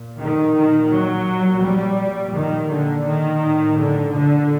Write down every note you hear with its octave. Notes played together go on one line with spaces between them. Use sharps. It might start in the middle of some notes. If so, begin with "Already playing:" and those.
Already playing: A#2
D#3
A#2 D#3
F#3
A#2
G3
A#2
D#3
A#2 D3
D#3
A2
D3
A#2 D3